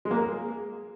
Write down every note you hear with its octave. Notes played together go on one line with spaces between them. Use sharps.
G#3
A#3
A#4
G#4